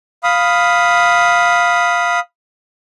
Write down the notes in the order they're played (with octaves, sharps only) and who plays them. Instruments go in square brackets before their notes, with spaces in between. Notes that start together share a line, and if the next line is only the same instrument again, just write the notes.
[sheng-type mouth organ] F5 B5 D#6